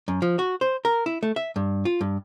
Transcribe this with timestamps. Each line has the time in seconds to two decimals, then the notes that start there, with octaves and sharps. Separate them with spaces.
0.08 F#2
0.22 F3
0.39 F#4
0.61 C5
0.85 A#4
1.06 E4
1.23 A3
1.36 E5
1.56 G2
1.85 F4
2.01 G2